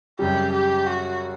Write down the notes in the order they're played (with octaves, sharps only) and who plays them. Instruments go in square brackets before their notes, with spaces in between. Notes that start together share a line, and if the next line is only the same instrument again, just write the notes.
[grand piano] F#2 C#3 G3 [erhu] G4
[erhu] G4
F#4